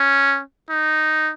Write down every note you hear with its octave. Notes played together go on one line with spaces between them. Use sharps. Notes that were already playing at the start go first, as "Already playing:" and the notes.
Already playing: C#4
D#4